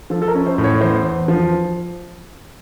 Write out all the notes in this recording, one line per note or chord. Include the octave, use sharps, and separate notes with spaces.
F3 A4
A4
A#4
C#4
C5
A2
C#5
E2 C5
E2
F3